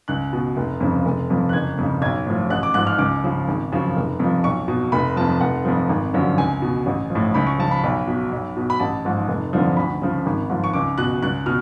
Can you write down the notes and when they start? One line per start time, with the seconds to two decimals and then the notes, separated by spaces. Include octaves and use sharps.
0.08 C#2 F#6
0.33 B2
0.57 F1
0.80 F2 C#3 F3
1.06 F1
1.30 F2 F3
1.49 F#6
1.53 F#1 G#6
1.78 F2 C#3
2.02 B1 G#6
2.26 A2 F3
2.50 A1 F#6
2.63 D6
2.74 G#2 F3 F#6
2.87 F6
2.98 C#2 D6
3.24 C#3 F3
3.48 G#1
3.72 F#2 C#3 F3
3.96 F1
4.20 F2 F3
4.44 B1 C#6
4.68 B2
4.92 F1 B5
5.16 F2 F3 A5
5.41 F1 F#5
5.65 F2 F3
5.89 G#1
6.14 F#2 D3 F3
6.37 C#2 G#5
6.62 B2
6.86 A1
7.10 F3
7.15 A2
7.34 C#2 B5
7.47 C#6
7.59 C#3 F3 A5
7.71 B5
7.84 B1
8.07 B2
8.32 B1
8.57 B2
8.70 B5
8.80 A1 A5
9.05 G#2 F3
9.28 F1
9.53 F2 D3 F3
9.77 D2 B5
10.02 C#3 F3
10.26 G#1
10.50 G#2 F3
10.64 C#6
10.73 C#2 D6
10.98 B2 F#6
11.23 C#2 F#6
11.46 B2 F6